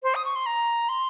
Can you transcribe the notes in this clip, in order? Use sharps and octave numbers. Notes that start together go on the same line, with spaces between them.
C5
D#6
C#6
C6
A#5
C6